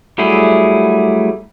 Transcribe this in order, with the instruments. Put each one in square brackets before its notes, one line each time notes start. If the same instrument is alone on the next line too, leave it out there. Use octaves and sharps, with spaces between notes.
[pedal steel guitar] F#3 G3 A3 E4 G#4